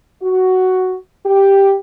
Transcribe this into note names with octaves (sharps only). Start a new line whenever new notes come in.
F#4
G4